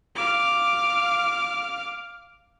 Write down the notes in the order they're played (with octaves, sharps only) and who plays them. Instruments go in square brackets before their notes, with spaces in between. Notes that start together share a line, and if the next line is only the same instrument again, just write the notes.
[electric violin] F5 D6